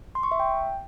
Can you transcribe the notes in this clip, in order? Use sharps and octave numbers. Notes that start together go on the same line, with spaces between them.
C6
C#6
E5
G5